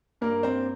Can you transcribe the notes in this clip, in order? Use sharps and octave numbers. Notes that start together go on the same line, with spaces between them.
G2 A#3 A#4
C4 C5